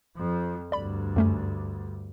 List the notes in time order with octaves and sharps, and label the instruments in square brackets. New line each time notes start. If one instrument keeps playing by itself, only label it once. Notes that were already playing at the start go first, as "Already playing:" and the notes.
[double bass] F2 F3
[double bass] D2 G2 [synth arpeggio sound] D5 B5
[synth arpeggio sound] F#2 A3 C#4